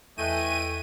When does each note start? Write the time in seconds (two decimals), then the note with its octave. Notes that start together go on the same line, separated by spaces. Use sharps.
0.18 E2 E3 A3 D#5 G5 G#5 F#6 D#7